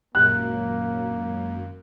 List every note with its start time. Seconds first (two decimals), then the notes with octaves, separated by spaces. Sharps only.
0.15 G#1 F#2 A#2 A#3 F#6